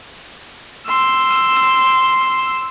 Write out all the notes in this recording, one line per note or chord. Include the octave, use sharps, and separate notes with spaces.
C6 E6